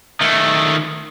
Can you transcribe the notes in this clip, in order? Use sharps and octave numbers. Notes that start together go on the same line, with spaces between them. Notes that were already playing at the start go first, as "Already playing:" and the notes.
D#3 A3